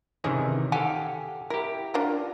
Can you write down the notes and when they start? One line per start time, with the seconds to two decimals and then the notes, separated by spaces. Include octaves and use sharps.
0.24 C3 D#3 E3 C#4 D#4 G#4
0.72 G4 A4 F5 F#5 G#5
1.50 E4 G4 A#4
1.94 D4 F4 A#4